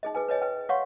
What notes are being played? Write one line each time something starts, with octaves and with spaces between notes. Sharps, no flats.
D#4 G#4 D#5
G#4 B4 G#5
B4 C#5 D#5 G#5
B4 G5
C#5 F5 F#5 C6 C#6